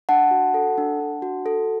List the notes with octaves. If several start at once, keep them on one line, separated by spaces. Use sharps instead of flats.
D4 F#5 A5
F#4
A4
D4
D4
F#4
A4